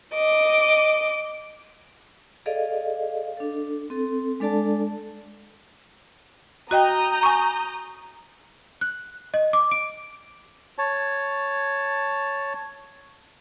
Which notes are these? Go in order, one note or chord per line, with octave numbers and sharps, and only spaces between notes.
D#5 D6
G#4 A4 D5 D#5 F5
D4 A4
C4 A4
G#3 D4 A4 D5 A5
F#4 D#5 G5 A#5 D#6 G6
G#5 C#6
F#6
D#5
D6
D7
C#5 A5